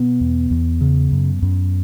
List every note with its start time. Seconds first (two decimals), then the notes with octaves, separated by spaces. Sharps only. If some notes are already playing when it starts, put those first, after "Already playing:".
Already playing: B2 B3
0.21 E2
0.51 E2
0.81 C#3
1.12 F#2
1.42 F#2